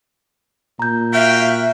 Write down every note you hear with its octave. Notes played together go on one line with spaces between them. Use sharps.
A#2 A#5 G6
F#4 E5 F5 G5